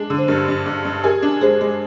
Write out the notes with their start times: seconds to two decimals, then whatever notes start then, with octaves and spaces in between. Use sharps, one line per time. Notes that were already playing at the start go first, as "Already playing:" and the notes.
Already playing: G#3 D4
0.10 D3
0.18 C5
0.28 G2 G4 A#4
0.48 G2
0.66 G2
0.85 G2
1.04 G4 G#4 A#4
1.22 D4
1.41 G#3 G#4 C5
1.61 G#3